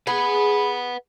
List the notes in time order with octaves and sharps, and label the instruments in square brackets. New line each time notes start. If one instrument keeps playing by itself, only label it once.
[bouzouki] G#4 [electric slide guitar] B4 F#5 [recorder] B5